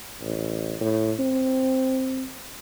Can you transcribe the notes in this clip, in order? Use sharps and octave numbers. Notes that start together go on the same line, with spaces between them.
A1
A2
C4